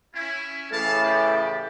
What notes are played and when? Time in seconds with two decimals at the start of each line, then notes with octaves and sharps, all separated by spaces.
0.14 C#4 E4
0.71 A2 C#3 E3 F5 A5
1.04 G4 D5